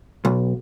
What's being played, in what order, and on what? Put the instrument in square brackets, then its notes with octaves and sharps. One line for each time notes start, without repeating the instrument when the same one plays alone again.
[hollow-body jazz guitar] B1